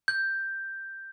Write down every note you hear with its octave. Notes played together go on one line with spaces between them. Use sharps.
G6